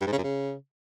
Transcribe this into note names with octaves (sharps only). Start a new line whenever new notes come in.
G2
G#2
C#3
F#2
C#3